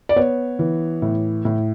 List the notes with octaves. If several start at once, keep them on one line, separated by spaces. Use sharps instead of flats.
D5
B3 C#5
E3
A2
A2